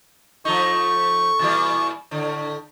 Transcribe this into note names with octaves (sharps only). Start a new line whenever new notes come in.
F3 A3 D#4 C#6
A#2 E3 G3
A2 D3